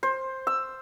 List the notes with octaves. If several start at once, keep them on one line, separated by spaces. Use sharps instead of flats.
C5
E6